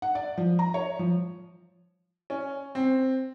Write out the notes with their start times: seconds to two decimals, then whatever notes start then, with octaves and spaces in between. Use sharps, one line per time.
0.02 F#5
0.15 D5
0.38 F3
0.59 A#5
0.74 C#5
0.99 F3
2.30 C#4
2.75 C4